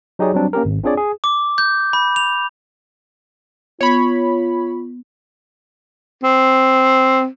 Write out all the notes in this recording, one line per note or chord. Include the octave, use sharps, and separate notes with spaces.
F#3 D#4 G4 G#4 C#5 D5
F#3 G3 C4 D4
A#3 C#4 G4 A#4
G#1
C4 D4 F4 G#4 C#5 D5
G#4
D6
G6
B5
F7
B3 F4 C#5 B5
C4